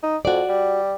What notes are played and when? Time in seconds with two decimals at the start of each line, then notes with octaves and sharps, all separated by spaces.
0.03 D#4
0.25 F2 F#4 D5
0.49 G3